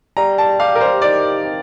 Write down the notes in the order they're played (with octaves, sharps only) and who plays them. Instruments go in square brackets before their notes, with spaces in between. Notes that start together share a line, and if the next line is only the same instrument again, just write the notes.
[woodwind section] G3 [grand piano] A#5
[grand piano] A5
[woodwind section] G4 [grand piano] F5
[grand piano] A#4
C5
[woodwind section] D#3 [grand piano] D5
[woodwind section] C4